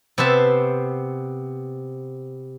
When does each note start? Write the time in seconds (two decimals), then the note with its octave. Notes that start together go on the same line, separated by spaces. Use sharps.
0.18 C3 B3 C5 E5 A5